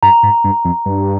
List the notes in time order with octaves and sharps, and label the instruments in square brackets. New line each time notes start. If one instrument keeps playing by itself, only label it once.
[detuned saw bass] G2 [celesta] A#5
[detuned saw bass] G#2
G2
F2
G2